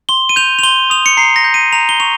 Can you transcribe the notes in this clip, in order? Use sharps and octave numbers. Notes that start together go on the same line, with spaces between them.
C6 G7
D#7
G6 F7
F7
C6 G7
D#6 F7
C#7
A#5 C7
A#6
G6
D#7
A#5 F7
G7
C#6 F7